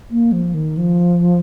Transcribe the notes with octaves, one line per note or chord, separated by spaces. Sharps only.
A#3
F3
D#3
F3